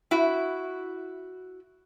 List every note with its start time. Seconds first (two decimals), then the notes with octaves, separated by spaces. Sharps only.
0.11 E4 F#4